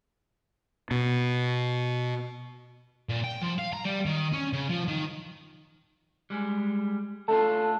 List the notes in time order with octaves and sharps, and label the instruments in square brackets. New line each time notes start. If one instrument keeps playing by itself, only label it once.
[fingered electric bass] B2
[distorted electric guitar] A#2
G5
F3
F5
A#5
G3
D#3
C#4
C#3
F3
D#3
[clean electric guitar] G3 G#3
[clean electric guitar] A3 D4 F4 [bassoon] A4